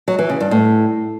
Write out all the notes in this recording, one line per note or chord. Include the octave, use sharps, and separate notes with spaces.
F#3
E3
C#3
G2
A2